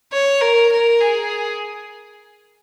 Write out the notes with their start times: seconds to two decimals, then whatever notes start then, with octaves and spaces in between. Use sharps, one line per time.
0.12 C#5
0.41 A#4
0.72 A#4
1.01 G#4